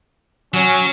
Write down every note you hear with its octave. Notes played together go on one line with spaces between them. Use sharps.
F#3 C#4